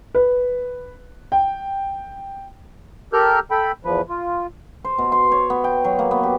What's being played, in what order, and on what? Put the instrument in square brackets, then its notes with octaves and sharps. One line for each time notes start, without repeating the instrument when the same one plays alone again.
[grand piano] B4
G5
[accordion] G4 A4 A#4 F6 G6
A4 G5 B5
E2 F3 B4
F4
[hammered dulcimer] C5
B2
C6
C#5
B3
G5
F#3
A#3
B3
G4